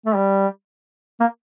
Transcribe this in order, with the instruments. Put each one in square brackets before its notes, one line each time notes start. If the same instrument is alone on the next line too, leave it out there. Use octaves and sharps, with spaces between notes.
[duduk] A3
G3
A#3